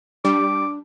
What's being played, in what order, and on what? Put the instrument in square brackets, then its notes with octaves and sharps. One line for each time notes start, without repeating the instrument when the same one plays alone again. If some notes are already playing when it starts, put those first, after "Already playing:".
[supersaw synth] G3 [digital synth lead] D4 [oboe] D6